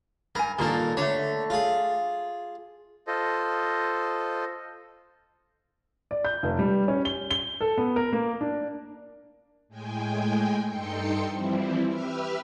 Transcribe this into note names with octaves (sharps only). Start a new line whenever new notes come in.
G2 A#4 G#5
G2 A#2 D#3 A#3 A4 A#4
D3 A3 C#5
F4 G#4
F4 A4 C5 D#5
D5
G6
F1
G3
C#4
G7
G7
A4
B3
A#4
A#3
D4
A2 G#3 G5 G#5
G2 D#4 A4 G5 C6 C#7
E3 F3 G3 C4 E4
G4 B4 E5 B5 E6 F6